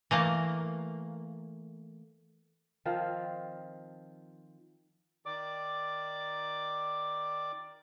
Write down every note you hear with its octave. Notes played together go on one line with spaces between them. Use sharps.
E3 A3 A#3
D#3 F3 C4 F4
D#3 D5 D6